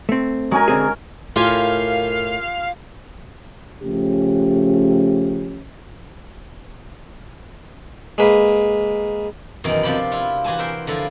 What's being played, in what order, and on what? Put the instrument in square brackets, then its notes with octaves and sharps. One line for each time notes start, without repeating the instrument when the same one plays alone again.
[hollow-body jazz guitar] A3 C4
[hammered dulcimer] F#3 C#4 A#4 [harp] G#3 G#5
[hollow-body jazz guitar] D3 C4 G#4
[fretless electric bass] A2 [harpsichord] F4 G4 G#5 [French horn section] A#4 [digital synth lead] F5
[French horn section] C#3 F3 A3 C#4 G4
[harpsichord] G#3 A#3 B4
[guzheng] F#2 B2 D#3 E3
C3 F3 D4 G4 B5
E4 F4
E3 F#4 G4 G#5 A5
A#4 C5 E5 G5
D3 F3 E4